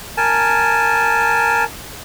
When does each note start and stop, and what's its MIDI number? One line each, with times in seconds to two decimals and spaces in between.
0.17 1.64 70
0.17 1.64 80
0.17 1.64 81